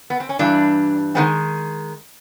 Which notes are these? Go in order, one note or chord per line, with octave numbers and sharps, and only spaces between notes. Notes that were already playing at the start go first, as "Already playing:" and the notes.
B3
C4
C#4
G2 E3 G3 D4
D#3 G#3 B3 C4